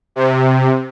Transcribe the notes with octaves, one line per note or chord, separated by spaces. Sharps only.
C3